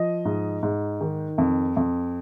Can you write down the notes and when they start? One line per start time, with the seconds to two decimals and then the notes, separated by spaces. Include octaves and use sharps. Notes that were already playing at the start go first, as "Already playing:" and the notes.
Already playing: F3 D#5
0.25 G#2
0.63 G#2
1.01 D#3
1.38 F2
1.76 F2